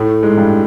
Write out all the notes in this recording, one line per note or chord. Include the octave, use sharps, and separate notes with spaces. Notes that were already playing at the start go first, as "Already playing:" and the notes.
Already playing: A2 A3
G#2 G#3
G2 G3